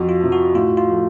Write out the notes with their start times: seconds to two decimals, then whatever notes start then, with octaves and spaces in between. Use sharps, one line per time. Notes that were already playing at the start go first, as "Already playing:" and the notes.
Already playing: F2 F#4
0.09 F4
0.20 C3 F3
0.32 F#4
0.55 A2 F4
0.77 F4
0.89 F3 A3